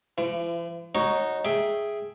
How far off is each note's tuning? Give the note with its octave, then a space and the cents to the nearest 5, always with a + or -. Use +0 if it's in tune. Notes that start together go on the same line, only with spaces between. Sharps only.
F3 -45 E4 +40
D#4 +0 F#4 +0 C#5 -25
G#4 +0 E5 +0 G5 +5